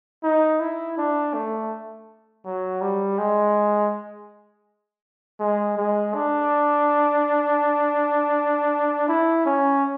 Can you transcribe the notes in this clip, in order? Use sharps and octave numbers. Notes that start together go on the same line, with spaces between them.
D#4
E4
D4
A3
F#3
G3
G#3
G#3
G#3
D4
E4
C#4